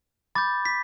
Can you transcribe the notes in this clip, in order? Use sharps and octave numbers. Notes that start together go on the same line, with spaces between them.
B5 D6 G6 A6
B6